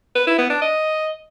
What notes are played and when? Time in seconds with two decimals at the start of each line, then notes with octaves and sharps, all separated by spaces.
0.15 B4
0.27 E4
0.39 B3
0.50 D4
0.62 D#5